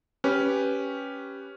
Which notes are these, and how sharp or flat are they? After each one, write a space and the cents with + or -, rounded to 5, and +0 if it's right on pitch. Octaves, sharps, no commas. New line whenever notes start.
C#4 +0 G4 +0 B4 +0